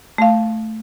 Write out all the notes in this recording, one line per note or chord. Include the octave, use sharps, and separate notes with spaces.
A3 F5